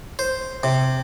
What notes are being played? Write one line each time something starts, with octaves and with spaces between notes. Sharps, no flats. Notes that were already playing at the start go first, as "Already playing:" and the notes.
C5
C3